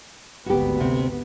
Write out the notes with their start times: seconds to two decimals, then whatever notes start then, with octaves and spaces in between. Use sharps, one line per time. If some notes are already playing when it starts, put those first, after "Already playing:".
0.46 G#1 D2 B3 F#4 G4
0.80 C3